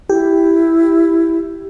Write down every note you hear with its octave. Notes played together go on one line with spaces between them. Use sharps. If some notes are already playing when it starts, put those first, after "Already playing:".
E4 G4